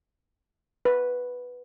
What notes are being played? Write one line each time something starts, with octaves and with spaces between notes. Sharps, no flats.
B4